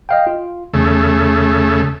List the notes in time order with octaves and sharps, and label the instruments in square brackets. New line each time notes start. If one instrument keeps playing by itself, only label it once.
[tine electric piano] D#5 F5 G5
F4
[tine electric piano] E2 [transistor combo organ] C#3 A3